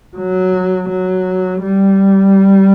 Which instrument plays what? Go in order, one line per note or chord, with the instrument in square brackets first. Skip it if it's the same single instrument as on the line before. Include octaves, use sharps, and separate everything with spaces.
[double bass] F#3
F#3
G3